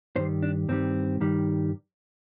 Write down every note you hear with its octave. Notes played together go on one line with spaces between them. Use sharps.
G2 D#3 G3 C5
D4
G2 D#3 G3 C4
G2 D#3 G3